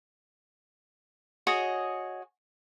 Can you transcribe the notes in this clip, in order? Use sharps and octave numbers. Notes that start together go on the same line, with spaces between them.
F#4 G#4 C#5 D#5